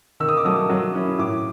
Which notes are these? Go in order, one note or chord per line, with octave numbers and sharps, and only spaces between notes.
D#3 E6
D#6
D6
F#3 A3 D#6
F#3
A#3 C#4 E4
A2 D6